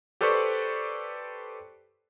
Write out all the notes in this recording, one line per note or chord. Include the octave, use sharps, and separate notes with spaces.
G4 A4 B4 C5 D5 C#6